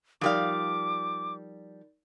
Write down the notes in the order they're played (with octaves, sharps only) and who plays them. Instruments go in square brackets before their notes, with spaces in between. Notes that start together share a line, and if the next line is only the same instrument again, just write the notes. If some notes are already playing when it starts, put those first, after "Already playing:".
[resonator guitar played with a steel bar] F3 G3 F5 [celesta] D#4 A#4 D5 [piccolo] D6